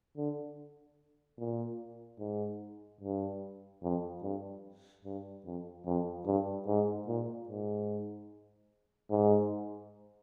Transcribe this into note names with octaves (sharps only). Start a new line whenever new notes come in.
D3
A#2
G#2
G2
F2
G2
G2
F2
F2
G2
G#2
A#2
G#2
G#2